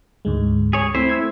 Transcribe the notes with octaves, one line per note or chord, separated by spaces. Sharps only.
D2 G#2 G#3
G#4 C#5
A3 C4 E4 C5
E6 G#6